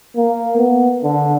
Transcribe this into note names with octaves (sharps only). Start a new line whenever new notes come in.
A#3
B3
D3